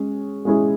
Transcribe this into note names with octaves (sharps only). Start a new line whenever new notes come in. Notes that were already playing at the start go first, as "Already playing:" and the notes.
Already playing: G#3 C#4 G#4
G#3 C#4 E4 G#4